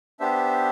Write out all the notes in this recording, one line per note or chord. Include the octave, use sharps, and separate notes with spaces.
B3 D4 G4 C5 E5